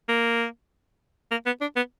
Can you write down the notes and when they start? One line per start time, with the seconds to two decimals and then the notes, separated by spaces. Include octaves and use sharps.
0.09 A#3
1.31 A#3
1.46 B3
1.61 D4
1.76 B3